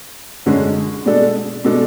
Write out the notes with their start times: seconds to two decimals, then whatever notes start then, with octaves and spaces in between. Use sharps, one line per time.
0.46 F#2 D3 G#3 C#4
1.06 B2 G#3 D4 A4 D5
1.65 B2 G#3 D4 A4 D5